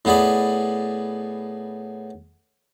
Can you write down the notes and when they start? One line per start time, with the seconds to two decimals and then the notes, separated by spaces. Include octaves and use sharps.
0.05 A2 B3 G#4 D5 B5